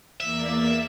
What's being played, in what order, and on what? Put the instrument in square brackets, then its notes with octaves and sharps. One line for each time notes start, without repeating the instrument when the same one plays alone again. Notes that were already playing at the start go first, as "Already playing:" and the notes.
[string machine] E2 A#3 D5 [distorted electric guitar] E5